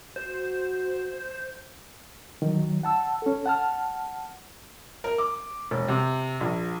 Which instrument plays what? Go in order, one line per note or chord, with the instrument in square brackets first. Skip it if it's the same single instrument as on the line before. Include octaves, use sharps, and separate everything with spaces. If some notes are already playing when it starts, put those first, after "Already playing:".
[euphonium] F#4 [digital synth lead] C5
[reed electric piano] D#3 F#3
F#5 A5 E6
C#4 A4
F#5 A5 F6
[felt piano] A#4
D6
E1
C3
A#1